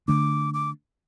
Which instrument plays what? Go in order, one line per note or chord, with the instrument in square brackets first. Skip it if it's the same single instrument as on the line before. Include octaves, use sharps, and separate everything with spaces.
[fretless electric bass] D3 A3 D4 [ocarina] D6
[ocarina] D6